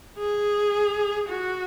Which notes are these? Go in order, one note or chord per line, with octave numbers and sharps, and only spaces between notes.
G#4
F#4